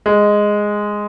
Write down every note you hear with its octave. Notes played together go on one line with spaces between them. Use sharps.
G#3